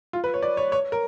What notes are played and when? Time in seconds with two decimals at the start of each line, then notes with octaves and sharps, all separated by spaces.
0.13 F4
0.24 B4
0.34 C#5
0.42 D5
0.57 C#5
0.72 C#5
0.92 A#4